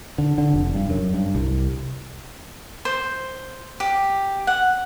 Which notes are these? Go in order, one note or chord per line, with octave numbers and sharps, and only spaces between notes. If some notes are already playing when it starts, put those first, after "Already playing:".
D3
D3
F1
G2
F#2
G2
C2
C5
G4
F#5